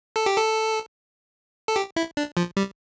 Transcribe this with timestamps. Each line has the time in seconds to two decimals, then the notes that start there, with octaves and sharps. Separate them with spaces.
0.16 A4
0.26 G4
0.37 A4
1.68 A4
1.76 G4
1.96 E4
2.17 D4
2.37 F3
2.57 G3